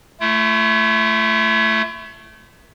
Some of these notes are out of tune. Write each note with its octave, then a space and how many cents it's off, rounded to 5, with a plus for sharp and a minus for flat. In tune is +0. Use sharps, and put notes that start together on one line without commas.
A3 +0 E4 +45